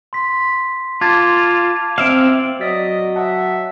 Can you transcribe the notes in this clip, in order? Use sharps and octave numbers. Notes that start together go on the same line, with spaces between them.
C6 B6
F4 A5 D6 G#6 A6
C4 E5 F5 D7 F#7
F#3 D5 D#5 A6 B6
E5 F#5 A5